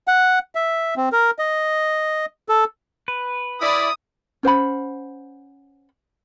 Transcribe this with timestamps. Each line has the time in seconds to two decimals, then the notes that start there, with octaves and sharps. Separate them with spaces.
0.08 F#5
0.55 E5
0.97 C4
1.12 A#4
1.39 D#5
2.49 A4
3.08 B4
3.61 E4 D5 D#6
4.43 C#4 C5 F#5 B5